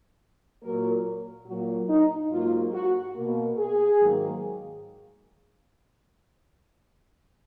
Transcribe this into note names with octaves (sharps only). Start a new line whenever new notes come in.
A#2 F#3 A#3 A#4
A#2 F#3 A#3 F#4
D#4
G#2 F#3 A#3 F4
F#4
B2 A#3
G#4
G#2 D#3 F#3 A#3